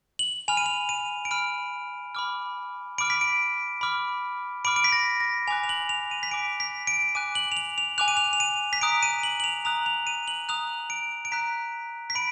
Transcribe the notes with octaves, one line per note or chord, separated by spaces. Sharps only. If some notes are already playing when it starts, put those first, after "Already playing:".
F#7
G#5 B5 F6 F7
D#7
F7
D#7
D7
G#5 B5 F6 D#7
B5 D6 F6
B5 D6 F6 D7
B6
D7
B5 D6 F6
B5 D6 F6 D7
D7
B6
A#6
A#6
G#5 D6 F#6 F7
F7
F#7
F7
D#7
B6
G#5 D6 F#6 D7
B6
D7
G#5 D6 F#6 D#7
F#7
F7
F#7
F7
G#5 D6 F#6 F7
D#7
F7
F7
D#7
B6
A#5 D#6 F#6 D7
D#7
F#7
F#7
F7
A#5 D#6 F#6 F7
F7
D#7
F#7
A#5 D#6 F#6 F7
D7
D7
A#5 D#6 F#6 B6
B6
B5 D7